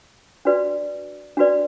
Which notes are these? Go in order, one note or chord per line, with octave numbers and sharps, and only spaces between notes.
D4 F#4 B4 D5
D4 F#4 B4 D5